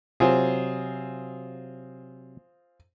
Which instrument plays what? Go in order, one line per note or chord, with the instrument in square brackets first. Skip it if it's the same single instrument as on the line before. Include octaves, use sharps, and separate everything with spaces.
[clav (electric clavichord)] C3 F#3 [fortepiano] C4 F4 G#4